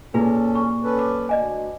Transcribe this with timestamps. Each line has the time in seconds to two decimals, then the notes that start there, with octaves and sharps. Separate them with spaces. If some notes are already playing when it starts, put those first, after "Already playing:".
0.14 A#2 C#4 E4 G#4 A4 B4
0.55 C#6
0.84 C#4 A4 B4
0.99 D6
1.29 D2 D5 D#5 G#5